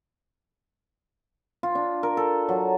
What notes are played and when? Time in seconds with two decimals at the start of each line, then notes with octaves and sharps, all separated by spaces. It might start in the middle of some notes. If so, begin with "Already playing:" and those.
1.63 F4
1.75 D4
2.03 A#4
2.17 A4
2.49 F#3